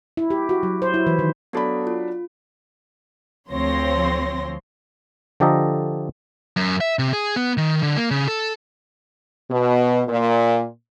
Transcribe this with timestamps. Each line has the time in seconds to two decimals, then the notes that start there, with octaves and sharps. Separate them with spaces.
0.17 E4
0.30 G4
0.49 F#4
0.63 F#3
0.82 C5
0.94 E4
1.07 E3
1.19 D#3
1.53 F#3 B3 D4 F#4 A4 B5
1.87 F4
3.51 D2 F3 C4 C#5 C6 A#6
5.40 D3 F3 G4 A4 D#5 A#5
6.56 F#2
6.81 E5
6.99 C3
7.13 G#4
7.36 B3
7.57 D#3
7.83 D3
7.97 A#3
8.11 C#3
8.28 A4
9.51 B2
10.09 A#2